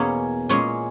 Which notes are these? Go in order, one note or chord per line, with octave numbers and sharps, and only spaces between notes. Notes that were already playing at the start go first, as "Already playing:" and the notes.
Already playing: E2 B2 A#3 C#4 C#5
A#2 G#3 C#4 C#5